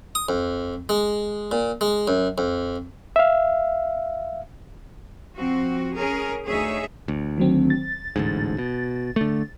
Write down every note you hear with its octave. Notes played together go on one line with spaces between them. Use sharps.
D#6
F2
G#3
A#2
G#3
F#2
F2
E5 F5
F3 C4 F#4
C#4 G#4 A#4
D2 D#4 G#4 C#5 E5
D2
D#3 F#3 C4
A6
A1 D2 G#2
B2
D3 A3